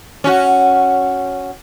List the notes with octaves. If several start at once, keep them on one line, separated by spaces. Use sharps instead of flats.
C#4 F#4